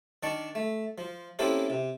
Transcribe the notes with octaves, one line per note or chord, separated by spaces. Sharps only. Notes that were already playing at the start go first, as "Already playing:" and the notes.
D#3 D4 A5 C#6
A3
F3
A#3 C4 C#4 E4 G4 A4
C3